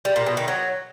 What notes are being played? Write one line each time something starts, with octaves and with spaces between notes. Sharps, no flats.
G3
A#2
B2
D#3
F#3